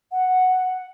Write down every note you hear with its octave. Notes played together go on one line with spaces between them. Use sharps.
F#5